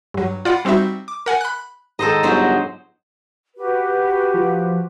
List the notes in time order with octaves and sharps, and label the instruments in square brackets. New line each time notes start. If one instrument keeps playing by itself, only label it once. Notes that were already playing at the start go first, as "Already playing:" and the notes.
[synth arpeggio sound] G2 F#3
F4 D5 F#5 B5
G3 C4 D#4 F#4 E5
D6
A#4 F#5 G#5
B5 F#6
[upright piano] G#2 [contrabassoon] D#3 [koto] A4 C5 D#5 [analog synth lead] A#5
[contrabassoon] G1 [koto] F#3 G#4 C5
[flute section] F#4 G4 B4
[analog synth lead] F3